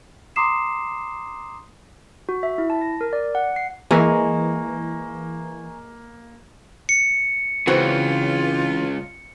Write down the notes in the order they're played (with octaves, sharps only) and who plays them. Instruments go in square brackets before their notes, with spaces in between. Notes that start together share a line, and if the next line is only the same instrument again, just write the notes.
[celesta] A#5 C6 D6 D#6 C7 E7
[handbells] F#4
E5
E4
A5
A#6
A#4
D5
F#5
C7
[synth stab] E3 [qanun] G#3 [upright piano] A#3 [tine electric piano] G#5 A#5 C#6
[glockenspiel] C#7
[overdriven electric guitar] C#2 C#3 [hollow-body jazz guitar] E3 C4 F#4 [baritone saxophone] F4